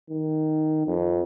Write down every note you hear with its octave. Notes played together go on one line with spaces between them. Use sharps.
D#3
F2